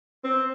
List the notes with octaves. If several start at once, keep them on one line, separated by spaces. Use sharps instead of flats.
C4